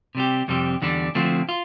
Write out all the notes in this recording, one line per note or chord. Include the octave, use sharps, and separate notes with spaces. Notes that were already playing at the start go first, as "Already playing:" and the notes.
C3 G3 C4 G4
F2 C3 G3 C4 G4
E2 D3 G3 D4
D3 F3 A3 C4
F4